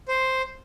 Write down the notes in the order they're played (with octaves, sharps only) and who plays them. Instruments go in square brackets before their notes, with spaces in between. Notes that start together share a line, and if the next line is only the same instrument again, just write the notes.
[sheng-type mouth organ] C5